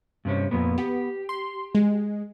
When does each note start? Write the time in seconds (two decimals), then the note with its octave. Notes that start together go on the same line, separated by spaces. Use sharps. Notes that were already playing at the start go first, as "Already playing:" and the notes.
0.25 G2 C3 C#4
0.51 F2 A#2 B3
0.78 B3 G4
1.29 C6
1.75 G#3